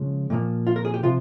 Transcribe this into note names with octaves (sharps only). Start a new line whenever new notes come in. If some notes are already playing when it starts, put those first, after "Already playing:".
Already playing: C#3 F3 G#3
A#2 F3 A#3
F4
A#4
G#4
G4
C3 F3 F4